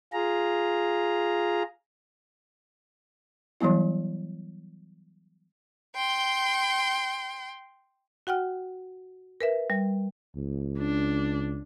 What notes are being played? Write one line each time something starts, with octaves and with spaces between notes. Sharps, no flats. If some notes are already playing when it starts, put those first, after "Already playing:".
F4 G#4 A#5
E3 F#3 G3 B3 E4
G5 C6
F#4 F#5 G5 F6
A#4 B4 E5
G3
C#2
D4